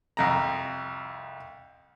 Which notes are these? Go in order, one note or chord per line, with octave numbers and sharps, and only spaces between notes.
C2 F2 A#5